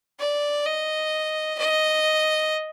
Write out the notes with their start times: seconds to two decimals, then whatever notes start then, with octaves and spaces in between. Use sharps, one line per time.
0.19 D5
0.65 D#5
1.58 D#5